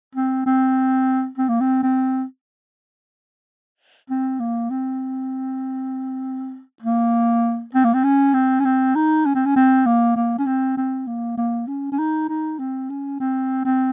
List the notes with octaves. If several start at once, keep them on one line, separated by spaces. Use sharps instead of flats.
C4
C4
C4
A#3
C4
C4
C4
A#3
C4
A#3
C4
A#3
C4
C#4
C4
C#4
C4
D#4
C#4
C4
C#4
C4
A#3
A#3
C#4
C4
C4
A#3
A#3
C#4
C#4
D#4
D#4
C4
C#4
C4
C4